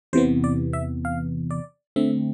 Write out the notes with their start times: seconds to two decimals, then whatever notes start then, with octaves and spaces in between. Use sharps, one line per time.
0.13 E2 C3 E3 B3 C5
0.44 D5
0.73 E5
1.05 F5
1.51 D5
1.96 D3 A3 C4 E5